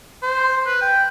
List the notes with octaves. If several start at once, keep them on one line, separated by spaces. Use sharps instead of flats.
C5
B4
G5